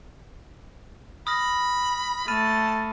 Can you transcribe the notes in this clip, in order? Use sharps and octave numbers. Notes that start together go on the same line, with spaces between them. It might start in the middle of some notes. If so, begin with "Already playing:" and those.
B5 D#6 F6 A#6
A3 A5 B5 F6 D#7